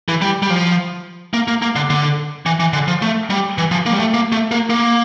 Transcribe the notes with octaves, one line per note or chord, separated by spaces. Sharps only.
E3
G3
G3
F3
A#3
A#3
A#3
D3
D3
E3
E3
D3
F3
A3
G3
E3
F3
A#3
G3
A3
A#3
A3
A#3
A#3